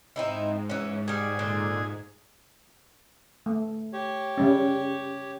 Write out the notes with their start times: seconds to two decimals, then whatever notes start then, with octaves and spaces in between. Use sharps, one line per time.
0.16 G#2 C4 D#4 E4
0.70 E3 C#4
1.08 G3 F#4 G#4
1.39 A#2 D3 F4
3.46 A3
3.93 G4 C#5
4.38 C#3 G3 C#4